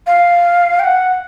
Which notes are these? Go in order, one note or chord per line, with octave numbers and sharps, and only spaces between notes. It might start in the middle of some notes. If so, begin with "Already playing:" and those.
F5
G5
F#5